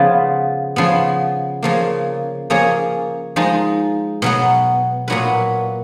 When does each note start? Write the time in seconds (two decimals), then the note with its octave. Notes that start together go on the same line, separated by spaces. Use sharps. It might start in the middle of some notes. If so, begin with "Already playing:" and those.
Already playing: C#3 F3 B3 F4
0.76 C#3 F3 B3
1.63 C#3 F3 A#3
2.50 F3 A#3 C#4 G#4 C#5
3.36 F3 G#3 D#4
4.22 B2 F#3 B3
5.08 A#2 F#3 B3 F#4 B4